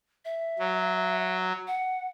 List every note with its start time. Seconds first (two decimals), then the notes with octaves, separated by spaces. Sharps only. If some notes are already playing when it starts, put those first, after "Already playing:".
0.25 E5
0.59 F#3
1.67 F#5